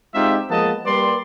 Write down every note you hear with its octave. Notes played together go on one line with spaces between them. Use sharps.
G#3 C4 D#4 F4 G4 E5
F3 G#3 A#3 B3 D#5 A5
G3 A#3 B4 D5 C6